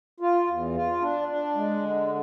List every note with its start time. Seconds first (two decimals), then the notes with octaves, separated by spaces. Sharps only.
0.20 F4
0.47 E2
0.74 F4
1.01 D4
1.28 D4
1.55 G#3
1.82 D3